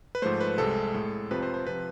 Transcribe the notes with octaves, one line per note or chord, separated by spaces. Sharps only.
B4
G#2 F3 A3 C5
B4
C2 C3 G#3 A4
A2 G#3
F2 C3 F3 B4
C5
C5
C3 F3 B4